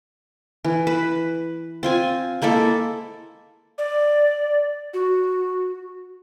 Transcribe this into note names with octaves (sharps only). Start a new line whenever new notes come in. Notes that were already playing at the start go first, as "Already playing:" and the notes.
E3
B4
C4 F4 G#5
G#3 A#3 E4 A4
D5
F#4